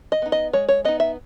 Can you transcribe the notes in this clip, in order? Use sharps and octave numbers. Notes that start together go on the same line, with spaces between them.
D#5
B3 D#4
D#5
G#3 C#5
C#5
B3 D#4 D#5
E5